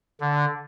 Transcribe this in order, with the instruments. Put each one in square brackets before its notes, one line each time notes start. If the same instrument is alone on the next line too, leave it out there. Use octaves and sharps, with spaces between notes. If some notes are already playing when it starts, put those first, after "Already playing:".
[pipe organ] D3